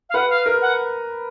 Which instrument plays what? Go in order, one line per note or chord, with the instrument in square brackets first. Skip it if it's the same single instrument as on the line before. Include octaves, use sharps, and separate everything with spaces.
[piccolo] F5
[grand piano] B4 [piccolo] F#5
[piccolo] F5
[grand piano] A#4
[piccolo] F#5